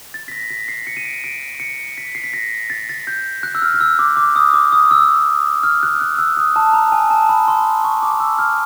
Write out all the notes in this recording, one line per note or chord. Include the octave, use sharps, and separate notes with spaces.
A6
B6
A#6
B6
C7
C#7
D#7
D7
D7
C#7
B6
C7
B6
A#6
A6
A6
G6
F#6
E6
F6
F6
E6
D6
D6
D#6
D6
D#6
E6
F6
F#6
F#6
E6
D#6
A5
A#5
G#5
A5
B5
C6
C#6
D6
E6
F6